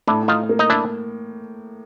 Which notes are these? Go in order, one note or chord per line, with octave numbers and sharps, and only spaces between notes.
A2 D4 E4
D#4 F4
A#3
D#4
D4 E4